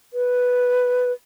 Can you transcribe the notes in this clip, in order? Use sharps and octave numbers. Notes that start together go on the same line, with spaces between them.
B4